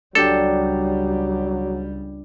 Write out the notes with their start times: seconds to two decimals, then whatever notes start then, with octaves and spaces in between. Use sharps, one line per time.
0.15 C#2 F#3 G3 D4 G4 A4 G5